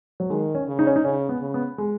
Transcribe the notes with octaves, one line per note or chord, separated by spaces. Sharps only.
F#3
D#3 G#3
C#4
C#3
D#4
C#4
D#4
C#3 C#4
B3
C#3
B3
G#3